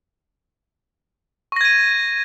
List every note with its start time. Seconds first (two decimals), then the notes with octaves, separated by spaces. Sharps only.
1.52 C#6
1.56 A#6
1.61 G#6
1.65 D#7